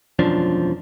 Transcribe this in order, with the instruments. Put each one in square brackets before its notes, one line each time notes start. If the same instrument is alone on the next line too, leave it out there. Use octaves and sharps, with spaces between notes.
[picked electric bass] E1 F#2 F3 D4